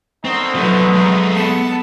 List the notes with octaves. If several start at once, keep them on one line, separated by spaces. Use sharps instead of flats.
D3 D#3 C4 D#4
F3 F#3 A3 B3
G#3 A3
B3 A4 A5